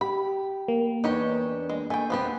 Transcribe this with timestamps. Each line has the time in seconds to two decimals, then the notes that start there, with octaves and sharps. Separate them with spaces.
0.01 G4 B5
0.68 A#3
1.04 E2 D4 D#4 G4 C#5
1.69 G#3
1.90 A3 G5 G#5
2.10 D#2 F3 B3 C4 G4